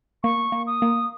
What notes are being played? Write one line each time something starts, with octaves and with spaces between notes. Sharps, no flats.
A#3 C#6
A#3
D#6
A#3